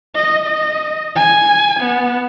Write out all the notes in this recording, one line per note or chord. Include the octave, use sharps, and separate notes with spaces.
D#5
D#5
G#5
B3